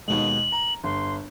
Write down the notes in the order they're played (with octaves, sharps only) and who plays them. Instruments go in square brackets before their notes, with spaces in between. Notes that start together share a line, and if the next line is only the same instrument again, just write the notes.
[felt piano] D#2 B2 G#3 [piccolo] F#7
[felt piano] A#5
[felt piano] G1 [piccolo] C6